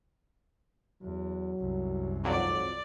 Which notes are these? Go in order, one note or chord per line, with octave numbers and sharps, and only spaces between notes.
E2 F#3
C2 F#2
G#1 F2 F#3 D5